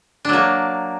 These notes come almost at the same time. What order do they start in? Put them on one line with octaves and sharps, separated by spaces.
D4 F#3 A#3